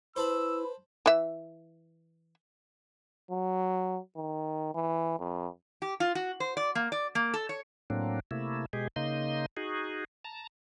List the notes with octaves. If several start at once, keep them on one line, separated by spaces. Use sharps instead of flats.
E4 B4 C5 A5 B5 E6
E3 E5
F#3
D#3
E3
F2
G4
F4
F#4
C5
D5
A#3
D5
A#3
A4
C#5
A2 F#3 A#3 C4 D4
C3 A3 A#3 E4
B2 G#3 G4 G#4
C#3 A#3 D#4 D#5 C6
D#4 F#4 G#4
A5 A#5